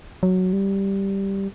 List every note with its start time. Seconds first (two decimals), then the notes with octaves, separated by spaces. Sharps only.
0.23 F#3
0.53 G3